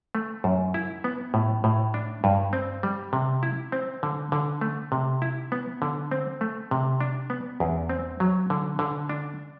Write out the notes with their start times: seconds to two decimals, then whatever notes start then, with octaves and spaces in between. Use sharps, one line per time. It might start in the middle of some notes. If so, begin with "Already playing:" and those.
0.15 A3
0.44 F#2
0.74 E4
1.04 B3
1.34 A2
1.64 A2
1.94 D4
2.24 G2
2.53 C4
2.83 G3
3.13 C3
3.43 E4
3.72 C4
4.03 D3
4.32 D3
4.61 A3
4.92 C3
5.22 E4
5.52 B3
5.82 D3
6.11 C4
6.41 A3
6.71 C3
7.01 D4
7.30 B3
7.60 E2
7.89 C4
8.20 F#3
8.50 D3
8.79 D3
9.09 D4